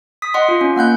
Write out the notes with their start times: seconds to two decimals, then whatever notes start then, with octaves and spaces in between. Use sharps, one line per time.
0.22 D#6 B6
0.34 D#5 F#5 C6
0.48 F4
0.61 C#4
0.76 A#3 F#5 F#6 G6